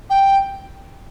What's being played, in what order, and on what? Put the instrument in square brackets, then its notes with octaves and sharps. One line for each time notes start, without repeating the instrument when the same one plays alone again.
[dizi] G5